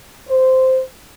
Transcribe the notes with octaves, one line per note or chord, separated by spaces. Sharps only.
C5